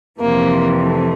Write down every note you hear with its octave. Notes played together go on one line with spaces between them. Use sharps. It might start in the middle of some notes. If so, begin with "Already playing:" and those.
F2 C3 E3 A#3
A3